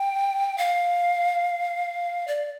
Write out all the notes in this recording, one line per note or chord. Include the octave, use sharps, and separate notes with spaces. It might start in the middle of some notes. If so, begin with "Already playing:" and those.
Already playing: G5
F5
D5